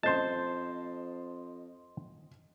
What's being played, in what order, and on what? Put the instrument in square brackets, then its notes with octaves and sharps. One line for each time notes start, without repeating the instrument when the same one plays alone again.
[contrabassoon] F2 [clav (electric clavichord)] C5 A5 [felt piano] D#5 C6